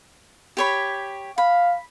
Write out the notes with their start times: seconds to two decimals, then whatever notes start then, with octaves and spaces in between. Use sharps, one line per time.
0.57 G4 C#5 B5
1.38 F5 B5